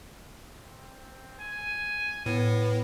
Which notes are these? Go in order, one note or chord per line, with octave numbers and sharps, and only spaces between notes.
C4
G#5
A2 B3 A4